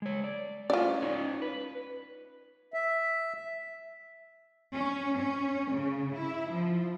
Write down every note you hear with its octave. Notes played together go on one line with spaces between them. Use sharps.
G#3 C#5
D5
C#4 E4 F4 D5
C#4 D#4 C#5
B4
E5
C#4
C#4
C#3
E4
F3